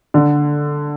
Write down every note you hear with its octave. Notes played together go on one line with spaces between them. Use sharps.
D3